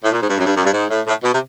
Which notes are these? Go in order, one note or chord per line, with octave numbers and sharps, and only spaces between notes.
A2
A#2
G#2
G2
F#2
G2
F#2
G2
G#2
A2
A2
B2
C3